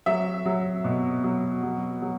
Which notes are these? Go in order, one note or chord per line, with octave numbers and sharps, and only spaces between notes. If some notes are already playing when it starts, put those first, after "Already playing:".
F#3 E5
F#3
B2
F#3
F#3
F#3